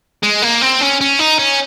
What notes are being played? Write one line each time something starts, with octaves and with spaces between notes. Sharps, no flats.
G#3
A#3
C4
C#4
C#4
D#4
C#4